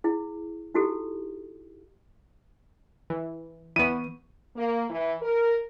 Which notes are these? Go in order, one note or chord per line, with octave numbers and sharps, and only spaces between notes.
E4 G#4
D#4 E4 F#4 G4 A4
E3
E3 B3 C#6 D#7
A#3
E3
A#4